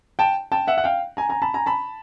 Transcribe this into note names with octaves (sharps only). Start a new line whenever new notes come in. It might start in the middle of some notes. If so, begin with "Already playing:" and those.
G5 A5
G5 A5
E5 F#5
F#5
F5 G5
G#5 A#5
G#5 A#5
A5 B5
G#5 A#5
A5 B5